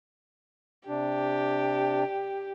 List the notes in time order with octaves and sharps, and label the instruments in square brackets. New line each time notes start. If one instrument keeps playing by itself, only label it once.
[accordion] C3 D4 [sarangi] G4